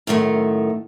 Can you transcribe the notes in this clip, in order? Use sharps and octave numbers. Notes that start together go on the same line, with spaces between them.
F#2 A2 D#3 G3 A3